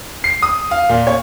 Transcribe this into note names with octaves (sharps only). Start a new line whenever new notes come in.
C7
D#6
F5
A#2
C#5